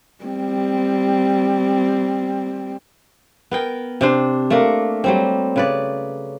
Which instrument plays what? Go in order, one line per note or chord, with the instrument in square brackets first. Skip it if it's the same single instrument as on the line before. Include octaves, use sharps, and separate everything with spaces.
[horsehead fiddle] G3 C4
[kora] B3 A#4 G5
C3 D4 C5
A3 A#3 D4 A#4
F#3 G3 C4
C#3 B4 D5